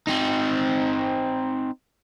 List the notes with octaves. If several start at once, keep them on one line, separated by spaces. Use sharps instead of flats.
C4 D#4